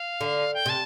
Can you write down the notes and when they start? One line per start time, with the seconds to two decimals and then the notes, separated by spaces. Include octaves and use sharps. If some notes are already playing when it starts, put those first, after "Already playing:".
Already playing: F5
0.21 D3
0.54 G5
0.66 C3 A5